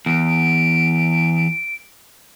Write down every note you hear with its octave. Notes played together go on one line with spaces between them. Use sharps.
E2 D7